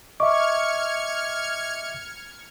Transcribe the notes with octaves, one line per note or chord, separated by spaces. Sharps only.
D#5 E5 C#6 D6 F6 G#6 C#7